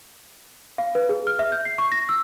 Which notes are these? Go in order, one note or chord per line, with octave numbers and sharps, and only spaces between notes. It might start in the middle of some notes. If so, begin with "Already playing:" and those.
F5
B4
G#4
F6
E5
G6
C7
C#6
A#6
E6